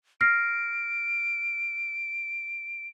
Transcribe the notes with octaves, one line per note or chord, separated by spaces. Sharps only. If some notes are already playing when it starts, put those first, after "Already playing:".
F6 A#6 C7 D7